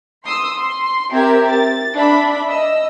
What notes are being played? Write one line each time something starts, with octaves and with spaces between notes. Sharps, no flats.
C6 D#6 E6
C6
C4 G4 A#4 E5 G#6
A6
D4 E5 B5
D#5 E6